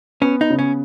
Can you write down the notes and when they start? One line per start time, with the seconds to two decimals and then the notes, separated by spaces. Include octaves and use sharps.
0.21 B3 C#4
0.41 D#4
0.50 C#3
0.59 C#4